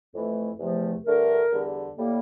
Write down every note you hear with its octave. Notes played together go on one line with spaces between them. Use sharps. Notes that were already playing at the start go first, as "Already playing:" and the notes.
F2 E3 A3
E2 C3 F3 A3
G2 D3 A3 A#4
E2 D3 G3
A2 G3 A#3